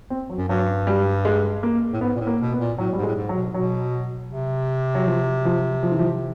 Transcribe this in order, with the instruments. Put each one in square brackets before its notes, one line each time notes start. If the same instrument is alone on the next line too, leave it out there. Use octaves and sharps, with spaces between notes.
[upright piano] C4
F#3
[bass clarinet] F#2
[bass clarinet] G2 [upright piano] F#3
[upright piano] G3
G#3
A#3
[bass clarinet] A2
[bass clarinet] G#2 [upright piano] B3
[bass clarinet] A#2
A2
[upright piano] A#3
[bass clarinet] B2
[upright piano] B3
[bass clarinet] A#2
[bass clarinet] A2 [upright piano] F#3
[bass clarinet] G#2 [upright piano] G3
[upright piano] G#3
[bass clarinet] A2
G#2
[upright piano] F#3
[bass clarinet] B2
[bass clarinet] B2 [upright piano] F#3
[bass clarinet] C3
[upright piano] F#3
F3
F3
F3
E3
F3